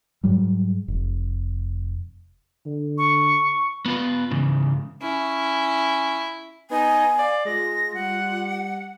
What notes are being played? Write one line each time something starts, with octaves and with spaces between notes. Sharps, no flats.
G#2 F#3 G3
F1
D3
C#6
B3 F4 B4
G#2 C#3 E3
C#4 E4
B3 D#4 G#5
D5 F5
G#3 F4 A#6
G3 F#5